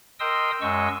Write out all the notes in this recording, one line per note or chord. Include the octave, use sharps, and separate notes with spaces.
A#4 D#5 G5 C6 D#6 E6
F#2 G#3 D#5 C#6 E6